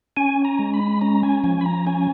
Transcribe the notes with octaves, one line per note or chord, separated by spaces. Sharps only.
C#4 G#5
A#5
G#3
B5
C#4 A#5
G#5
F3 G#5
B5
A#5
C#4 G#5